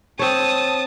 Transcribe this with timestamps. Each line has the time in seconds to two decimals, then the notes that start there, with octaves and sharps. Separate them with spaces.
0.19 C4 C#5 A5 D#6